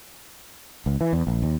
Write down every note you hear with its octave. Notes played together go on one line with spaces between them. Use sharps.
C#2
E3
E2
A#1
D#2